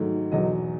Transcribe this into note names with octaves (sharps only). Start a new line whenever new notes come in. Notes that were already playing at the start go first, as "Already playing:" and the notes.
Already playing: G#2 D#3 F#3 A3
E2 B2 F#3 D#5